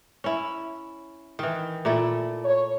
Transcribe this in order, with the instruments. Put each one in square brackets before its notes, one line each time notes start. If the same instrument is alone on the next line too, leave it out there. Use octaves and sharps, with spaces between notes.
[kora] C#4 E4
D#3 E3
A#2 A3 E4
[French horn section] C#5